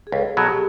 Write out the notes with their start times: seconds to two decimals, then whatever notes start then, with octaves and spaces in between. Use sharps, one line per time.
0.07 G#4
0.12 C#2 A4
0.28 G#4
0.37 B2 F#3
0.45 G4